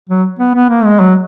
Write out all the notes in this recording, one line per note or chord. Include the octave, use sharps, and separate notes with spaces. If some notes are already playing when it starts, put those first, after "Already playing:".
F#3
B3
B3
A#3
G#3
F#3